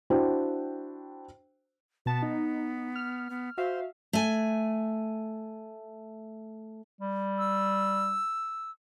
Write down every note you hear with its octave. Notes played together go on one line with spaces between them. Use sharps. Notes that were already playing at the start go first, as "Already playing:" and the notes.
D4 E4 F#4 C5 G5
B2 B3 A5
D#4
F6
B3
F#4 C5 E5 F5
A3 G#5
G3
E6